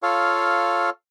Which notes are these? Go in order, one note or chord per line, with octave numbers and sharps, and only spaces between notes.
F4 A4 C#5 F5